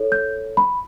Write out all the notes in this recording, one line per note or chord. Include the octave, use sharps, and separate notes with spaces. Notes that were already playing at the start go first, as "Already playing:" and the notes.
Already playing: E4 A4 C#5
G6
B5